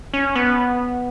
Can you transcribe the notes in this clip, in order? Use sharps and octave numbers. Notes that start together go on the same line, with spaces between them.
C#4
B3